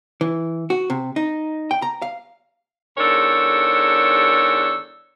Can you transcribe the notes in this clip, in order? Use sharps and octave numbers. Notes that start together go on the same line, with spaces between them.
E3
F#4
C3
D#4
G5
A#5
F5
E2 G#2 D4 A4 A#4 C#5